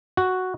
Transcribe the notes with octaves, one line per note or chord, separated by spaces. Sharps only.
F#4